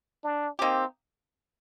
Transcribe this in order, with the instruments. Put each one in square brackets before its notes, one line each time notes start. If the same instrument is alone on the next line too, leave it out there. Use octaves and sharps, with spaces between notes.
[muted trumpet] D4
[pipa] A#3 D#4 G4 [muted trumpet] C4